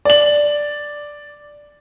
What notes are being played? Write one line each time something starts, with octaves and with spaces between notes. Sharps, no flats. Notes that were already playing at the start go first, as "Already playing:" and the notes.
D5 F#7